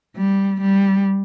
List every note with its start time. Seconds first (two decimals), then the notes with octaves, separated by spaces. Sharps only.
0.16 G3
0.61 G3